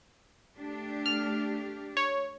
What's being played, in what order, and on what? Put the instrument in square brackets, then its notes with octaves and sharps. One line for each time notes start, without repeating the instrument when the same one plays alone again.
[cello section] A3 D4 G4
[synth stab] F6
C#5